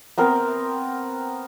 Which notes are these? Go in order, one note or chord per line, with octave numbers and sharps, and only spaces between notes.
B3 C4 A#4